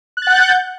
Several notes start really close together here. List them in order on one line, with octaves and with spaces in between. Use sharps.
F#6 A6 F#5 G6